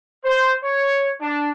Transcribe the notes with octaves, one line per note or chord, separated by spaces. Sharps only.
C5
C#5
D4